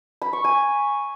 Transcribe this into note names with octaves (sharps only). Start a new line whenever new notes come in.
B5
C#6
G#5